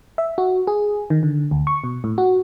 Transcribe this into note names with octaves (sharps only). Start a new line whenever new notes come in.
E5
F#4
G#4
D#3
D3
D2
C#6
B2
A2
F#4